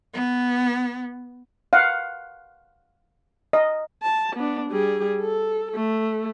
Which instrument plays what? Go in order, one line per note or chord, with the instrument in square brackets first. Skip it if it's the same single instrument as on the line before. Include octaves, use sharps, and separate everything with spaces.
[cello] B3
[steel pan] F5 F#5
D#5
[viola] A5
B3 D4
G3 G#4
A4
A3